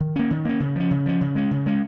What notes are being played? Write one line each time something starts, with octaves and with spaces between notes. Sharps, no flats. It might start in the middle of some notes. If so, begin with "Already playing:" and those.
D#3
A#3 C#4
D#3
A#3 C#4
C#3
F3 C#4
C#3
F3 C#4
C#3
G#3 C#4
C#3
G#3 C#4